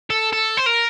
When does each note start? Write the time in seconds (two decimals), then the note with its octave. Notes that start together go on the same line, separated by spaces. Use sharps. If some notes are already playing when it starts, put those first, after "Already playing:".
0.10 A4
0.33 A4
0.57 C5
0.66 A#4